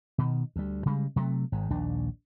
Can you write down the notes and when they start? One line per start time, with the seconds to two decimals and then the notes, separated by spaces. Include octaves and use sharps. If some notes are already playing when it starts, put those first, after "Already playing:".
0.18 B2 D#3
0.56 D2 G3
0.86 C#3 G3 G#3
1.16 C3 F#3 G#3 A3
1.52 G#1 G#2
1.70 A#1 D#2 D4